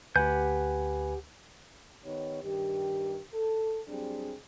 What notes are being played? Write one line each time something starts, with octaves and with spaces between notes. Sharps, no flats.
D2 G4 B4 F#5 G#5 G6
D#3 B3 D#4 G4 C#5
G2 D#3 G4
A4
F#3 G3 C4 D4 G#4